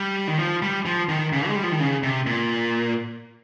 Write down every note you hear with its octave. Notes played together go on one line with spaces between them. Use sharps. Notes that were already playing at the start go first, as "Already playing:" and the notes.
Already playing: G3
D#3
F3
G3
F3
D#3
C#3
G#3
G3
F3
D#3
C#3
C3
A#2